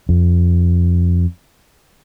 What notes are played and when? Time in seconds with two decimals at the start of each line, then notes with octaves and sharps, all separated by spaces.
0.09 F2